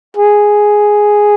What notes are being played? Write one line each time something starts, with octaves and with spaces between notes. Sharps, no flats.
G#4